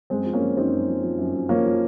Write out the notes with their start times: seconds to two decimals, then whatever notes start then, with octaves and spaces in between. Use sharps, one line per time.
0.10 F#2 G#3 C4
0.26 F3
0.33 A#3 C#4
0.42 F3
0.57 F#2 C4 D#4
0.73 F#2
0.87 F3
1.03 F3
1.18 F#2
1.34 F#2
1.49 F3 A#3 C#4
1.65 F3